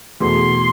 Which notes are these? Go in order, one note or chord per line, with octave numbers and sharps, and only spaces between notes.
E2 B2 A3 C6